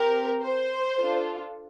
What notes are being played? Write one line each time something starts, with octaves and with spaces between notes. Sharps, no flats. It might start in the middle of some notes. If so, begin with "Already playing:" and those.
Already playing: C4 G4 A#4
C5
D4 F4 A4